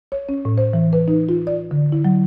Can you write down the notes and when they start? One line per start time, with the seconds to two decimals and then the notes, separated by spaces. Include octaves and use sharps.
0.12 C#5
0.29 C#4
0.45 A2
0.58 C5
0.73 E3
0.93 B4
1.08 D#4
1.29 F4
1.47 D5
1.71 D3
1.92 E4
2.05 F#3